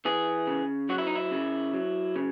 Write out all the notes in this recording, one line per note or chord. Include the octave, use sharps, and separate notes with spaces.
E3 G#4
C#3
F#3 F#4
E4
D#4
E4
C#3
F#3
C#3